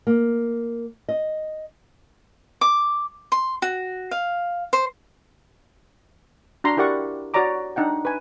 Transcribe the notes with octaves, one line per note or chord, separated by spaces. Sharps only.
A#3
D#5
D6
C6
F#4
F5
C5
D4 F#4 A#5 C6
E4 G4 A#4 D5 F#5 C#6
F#4 C#5 D5 A#5 D6
D4 D#4 F#5 G5
B4 G#5